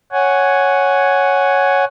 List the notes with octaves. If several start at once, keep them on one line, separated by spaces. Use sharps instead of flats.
C#5 F#5 G#5